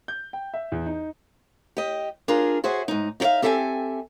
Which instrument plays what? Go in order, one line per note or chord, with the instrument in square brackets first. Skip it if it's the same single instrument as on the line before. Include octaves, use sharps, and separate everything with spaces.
[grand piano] G6
G5
E5
E2
D#4
[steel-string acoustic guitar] G4 D#5
D4 F4 G#4 A#4
F#4 G#4 C5 E5 F#5
G#2 D#4
D#4 F#4 C#5 E5 F5
C4 G4 A4 E5 F#5 G#5